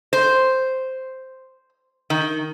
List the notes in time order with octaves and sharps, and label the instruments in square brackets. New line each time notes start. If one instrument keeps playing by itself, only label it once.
[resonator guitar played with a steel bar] C5
D#3